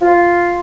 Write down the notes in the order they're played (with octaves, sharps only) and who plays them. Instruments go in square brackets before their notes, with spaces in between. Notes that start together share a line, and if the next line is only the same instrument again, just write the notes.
[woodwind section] F4